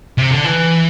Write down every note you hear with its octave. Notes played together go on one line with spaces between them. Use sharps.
C3
D3
E3